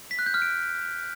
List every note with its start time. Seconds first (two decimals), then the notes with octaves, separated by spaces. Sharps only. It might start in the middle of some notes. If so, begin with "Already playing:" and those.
0.11 B6
0.19 F#6
0.26 G6
0.34 F6
0.42 D7